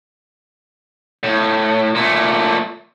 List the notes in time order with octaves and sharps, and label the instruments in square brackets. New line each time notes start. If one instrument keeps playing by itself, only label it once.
[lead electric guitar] A2
A#2 A3